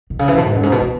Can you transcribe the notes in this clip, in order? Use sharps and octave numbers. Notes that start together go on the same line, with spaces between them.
B2
C#3
E3
G#2
B2
G#2
F#2
G#2
B2
E3